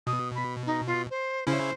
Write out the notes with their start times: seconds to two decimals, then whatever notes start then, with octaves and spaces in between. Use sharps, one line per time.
0.07 B2 D#6
0.35 B5
0.66 D#4
0.86 F4
1.10 C5
1.47 C#3 C#4 E4 C5